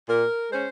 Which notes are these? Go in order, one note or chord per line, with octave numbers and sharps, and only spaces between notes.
A#2 A#4
G#3 C#4 C5